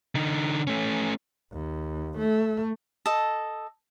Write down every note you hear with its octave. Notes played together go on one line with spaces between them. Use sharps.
D3 D#4
A3 C#4
D#2
A3
A4 D#5